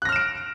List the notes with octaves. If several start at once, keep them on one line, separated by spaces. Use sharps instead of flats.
F6 F#6 A#6 D7 E7